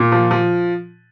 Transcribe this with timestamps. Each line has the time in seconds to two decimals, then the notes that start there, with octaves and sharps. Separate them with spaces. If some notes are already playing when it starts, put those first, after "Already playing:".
Already playing: A#2
0.12 F3
0.31 F3